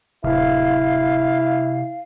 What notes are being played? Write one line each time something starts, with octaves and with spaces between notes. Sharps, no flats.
D1 C3 E4 F5